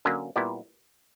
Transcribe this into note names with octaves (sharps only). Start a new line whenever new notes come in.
D3 F#3 A#3 C#4
A#2 G3 B3 E4 G4